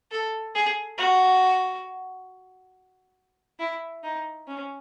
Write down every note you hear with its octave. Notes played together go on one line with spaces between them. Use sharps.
A4
G#4
F#4
E4
D#4
C#4